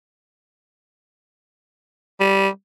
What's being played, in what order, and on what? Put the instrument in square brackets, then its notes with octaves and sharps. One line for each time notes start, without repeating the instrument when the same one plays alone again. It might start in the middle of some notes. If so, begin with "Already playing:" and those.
[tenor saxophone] G3